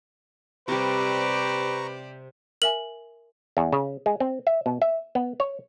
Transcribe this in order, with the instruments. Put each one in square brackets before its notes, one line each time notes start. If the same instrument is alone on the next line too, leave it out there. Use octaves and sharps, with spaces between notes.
[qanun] C3 G3 [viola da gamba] G4 C5 D5 [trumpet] B4 [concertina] A#5 C#6
[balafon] A#4 E5 G#5 [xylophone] F#7
[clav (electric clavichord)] E2
C#3
G#3
C4
E5
B2
E5
B3
C#5